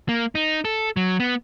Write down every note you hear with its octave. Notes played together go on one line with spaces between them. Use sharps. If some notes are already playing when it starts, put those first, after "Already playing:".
A#3
D#4
A4
F#3
B3